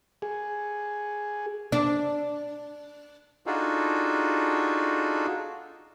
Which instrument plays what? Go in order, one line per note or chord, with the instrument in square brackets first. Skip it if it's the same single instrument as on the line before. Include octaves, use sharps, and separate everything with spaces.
[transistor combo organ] G#4
[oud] D4
[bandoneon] D4 D#4 F4 F#4 G#4 A4